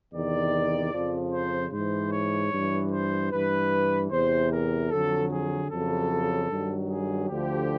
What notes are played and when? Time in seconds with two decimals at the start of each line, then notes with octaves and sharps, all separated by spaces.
0.13 E2 C3 D#3 D5
0.93 F2 C#3 F3
1.33 C5
1.73 G#2 E3 C5
2.13 C#5
2.52 G2 E3
2.92 C5
3.31 G2 E3 B4
4.11 E2 C3 E3 C5
4.51 A#4
4.90 F2 D3 F#3 A4
5.31 G#4
5.70 F2 C#3 F#3 A4
6.50 G2 D#3 F#3
6.89 G#4
7.29 D2 D3 F3 G4